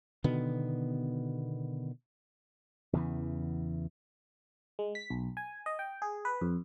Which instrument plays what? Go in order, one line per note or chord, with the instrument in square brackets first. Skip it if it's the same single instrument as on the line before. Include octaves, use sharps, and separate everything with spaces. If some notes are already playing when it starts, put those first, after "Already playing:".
[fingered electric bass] B2 D3 D#3 B3
[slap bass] E2 C#3 E3
[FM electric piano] G#3
B6
B1
G#5
D#5
G5
G#4
B4
F2